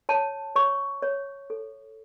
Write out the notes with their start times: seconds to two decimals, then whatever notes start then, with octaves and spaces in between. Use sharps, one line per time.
0.09 C#5 A5
0.55 C#5 C#6
1.03 C#5
1.50 A4